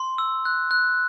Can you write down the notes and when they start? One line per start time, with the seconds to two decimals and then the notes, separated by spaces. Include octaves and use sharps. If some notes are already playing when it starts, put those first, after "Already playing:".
Already playing: C6
0.18 E6
0.45 F#6
0.71 F#6